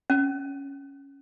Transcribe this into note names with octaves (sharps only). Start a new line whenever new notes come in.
C#4